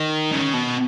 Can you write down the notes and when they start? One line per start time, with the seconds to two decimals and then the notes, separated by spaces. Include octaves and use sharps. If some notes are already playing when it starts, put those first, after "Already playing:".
Already playing: D#3
0.32 C#3
0.54 B2